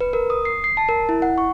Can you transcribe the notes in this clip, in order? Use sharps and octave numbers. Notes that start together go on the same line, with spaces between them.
B4
A#4
D#6
C7
C7
A5
A#4
E4
F#5
C#6